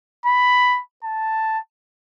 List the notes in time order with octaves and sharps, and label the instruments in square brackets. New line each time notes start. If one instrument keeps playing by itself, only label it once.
[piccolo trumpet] B5
A5